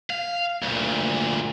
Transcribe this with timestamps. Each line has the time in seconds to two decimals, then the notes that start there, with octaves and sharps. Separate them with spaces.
0.10 F5
0.63 D2 A#2